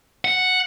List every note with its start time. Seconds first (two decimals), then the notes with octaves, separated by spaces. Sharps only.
0.25 F#5